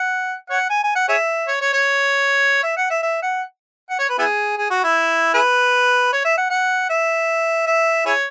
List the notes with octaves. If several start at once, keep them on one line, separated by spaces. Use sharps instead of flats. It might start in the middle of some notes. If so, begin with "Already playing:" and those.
Already playing: F#5
C#5 F#5
G#5
G#5
F#5
G#4 C#5 E5
C#5
C#5
C#5
E5
F#5
E5
E5
F#5
F#5
C#5
B4
B3 E4 G#4
G#4
F#4
E4
E4 G#4 B4
C#5
E5
F#5
F#5
E5
E5
E4 G#4 C#5